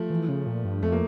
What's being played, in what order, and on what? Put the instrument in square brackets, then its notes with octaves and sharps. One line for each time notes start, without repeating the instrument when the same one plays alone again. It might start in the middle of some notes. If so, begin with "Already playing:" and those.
Already playing: [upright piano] F3 A3
[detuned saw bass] E3
C#3
A#2
G2
[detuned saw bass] F2 [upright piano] A3
[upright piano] A#3